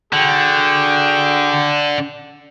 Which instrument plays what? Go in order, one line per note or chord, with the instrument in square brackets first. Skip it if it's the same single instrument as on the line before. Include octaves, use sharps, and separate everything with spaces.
[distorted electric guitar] D3 [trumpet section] F#4 G#4 G5